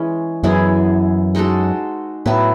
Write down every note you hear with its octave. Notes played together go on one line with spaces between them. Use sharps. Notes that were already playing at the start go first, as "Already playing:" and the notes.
Already playing: E3 G#3 C#4
F#2 E3 B3 E4 G#4
G#3 D#4 F#4 A4
A2 F#3 B3 E4 B4